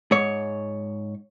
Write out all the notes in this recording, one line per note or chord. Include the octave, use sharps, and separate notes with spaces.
G#2 C#5